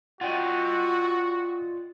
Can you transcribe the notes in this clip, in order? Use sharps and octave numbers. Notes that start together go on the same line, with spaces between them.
F4 F#4 D5 D#5 F#5 G5